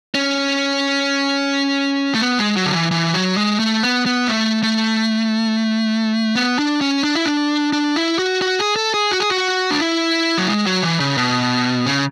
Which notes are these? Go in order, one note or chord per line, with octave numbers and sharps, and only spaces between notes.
C#4
A3
B3
G#3
F#3
D3
E3
E3
F#3
G#3
A3
B3
B3
A3
A3
B3
D4
C#4
D4
E4
D4
D4
E4
F#4
F#4
G#4
A4
G#4
F#4
G#4
F#4
D4
E4
F#3
G#3
F#3
E3
C#3
B2
C#3